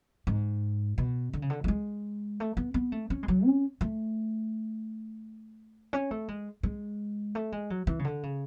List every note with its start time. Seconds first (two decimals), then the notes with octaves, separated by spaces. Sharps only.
0.27 G#2
0.98 B2
1.33 D3
1.42 C#3
1.50 D3
1.64 A3
1.68 G#3
2.40 A3
2.57 B3
2.74 B3
2.92 A3
3.10 C#4
3.23 G#3
3.28 F#3
3.45 C#4
3.81 A3
5.93 C#4
6.11 A3
6.28 G#3
6.63 G#3
7.35 A3
7.52 G#3
7.70 F#3
7.87 E3
7.99 C#3
8.04 D3
8.23 C#3